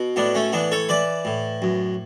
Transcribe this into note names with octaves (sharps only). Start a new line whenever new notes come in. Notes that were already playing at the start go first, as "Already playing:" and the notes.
Already playing: B2
A2 B3 D4
A3 C#4
E3 B3 D4
A4 C#5
E3 B4 D5
A2
F#2